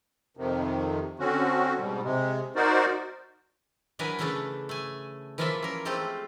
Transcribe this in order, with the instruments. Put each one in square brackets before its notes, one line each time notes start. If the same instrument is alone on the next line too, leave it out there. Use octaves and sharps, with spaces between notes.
[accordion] F2 C3 D#3
D3 C4 C#4 F#4
G#2 B2 G3
C3 G#3
D#4 F#4 A#4 C5 D5
[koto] E3 F#3 D4 A#4 B4 G#5
C#3 E3 A3 C#4 D4 A4
A3 G#5
E3 F3 A#3 F4 D5 E5
C#4 A#4
G#3 A3 C4 F4 G4 A4